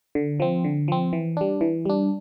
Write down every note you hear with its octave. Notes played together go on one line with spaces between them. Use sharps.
D3
F3 C4
D3
F3 C4
E3
G3 D4
E3
G3 D4